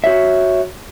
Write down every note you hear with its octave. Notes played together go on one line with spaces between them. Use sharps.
F#4 C#5 E5